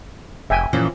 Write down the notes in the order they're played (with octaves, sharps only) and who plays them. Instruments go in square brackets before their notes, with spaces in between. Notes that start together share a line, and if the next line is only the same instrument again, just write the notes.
[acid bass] F1 [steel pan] E5 G5 G#5
[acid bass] A#2 [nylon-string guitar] E3 F3 C#4